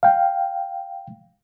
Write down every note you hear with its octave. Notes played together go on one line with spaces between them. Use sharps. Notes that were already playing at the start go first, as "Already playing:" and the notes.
F5 G5